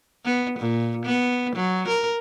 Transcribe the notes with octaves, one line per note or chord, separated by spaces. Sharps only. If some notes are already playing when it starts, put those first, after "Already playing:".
B3
A#2
B3
F#3
A#4